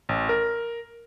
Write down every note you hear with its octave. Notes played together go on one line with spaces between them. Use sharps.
A1
A#4